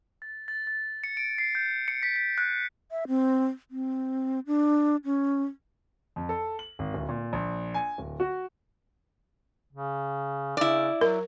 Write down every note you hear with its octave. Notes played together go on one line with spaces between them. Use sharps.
A6
A6
A6
C#7
D7
C7
G6
C#7
B6
B6
F#6
E5
C4
C4
D4
C#4
F2
A4
F#7
G#1
D1
A#2
A#1
G#5
D1
F#4
C#3
C#3 E4 D5
F#3 A#4